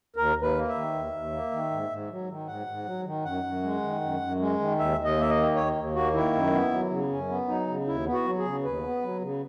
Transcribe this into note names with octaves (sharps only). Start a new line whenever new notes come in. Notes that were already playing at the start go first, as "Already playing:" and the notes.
D#2 A#4
D#2
B4
A#3
E5
D#3
D#2
D#2
A#3
D#3
G#2
G#2
F#3
D#3
G#2 F#5
G#2
F#3
D#3
F#2 F#5
F#2
G#3
D#3
F#2
F#2
G#3
D#3
D#2 E5
D#2
D#5
A#3 E5
D#5
D#3
D#2 C#5
D#2
A#3 F#4
D#3 E4
F#2
B3
F#3
C#3
F#2 C#4
B3
F#3 D#4
C#3
D#2 E4
B3
F#4
F#3
G#4
C#3
D#2 B4
B3
F#3
C#3